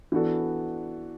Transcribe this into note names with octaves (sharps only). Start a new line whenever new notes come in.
E3 B3 D4 F#4 A4